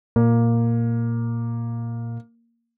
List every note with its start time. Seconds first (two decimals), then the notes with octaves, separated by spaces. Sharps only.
0.16 A#2 A#3